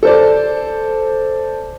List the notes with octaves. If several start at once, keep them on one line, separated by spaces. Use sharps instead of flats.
A4 C5 D5